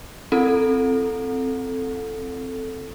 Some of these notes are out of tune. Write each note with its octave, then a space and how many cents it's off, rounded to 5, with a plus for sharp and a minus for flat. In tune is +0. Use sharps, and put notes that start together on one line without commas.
C4 +0 E4 +45 A4 +0